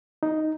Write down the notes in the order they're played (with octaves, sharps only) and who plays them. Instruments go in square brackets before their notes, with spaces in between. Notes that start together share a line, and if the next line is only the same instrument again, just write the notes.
[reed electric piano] D#4